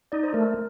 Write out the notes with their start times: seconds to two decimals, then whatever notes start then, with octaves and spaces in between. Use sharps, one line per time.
0.12 D#4 D5
0.24 C5
0.34 A3 A#4